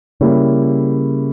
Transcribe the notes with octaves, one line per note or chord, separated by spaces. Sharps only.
C#3 G3 A#3 E4 G4 C#5